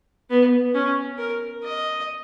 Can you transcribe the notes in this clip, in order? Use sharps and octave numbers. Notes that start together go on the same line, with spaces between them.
B3
C#4
A#4
D#5